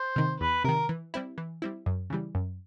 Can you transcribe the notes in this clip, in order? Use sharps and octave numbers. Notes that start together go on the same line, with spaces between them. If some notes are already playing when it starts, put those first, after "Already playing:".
Already playing: C5
C3 D#3
E2 B4
C3 D#3 A#4
E3
G3 C4 E4
E3
G3 C4 E4
F#2
C#3 E3 G3
F#2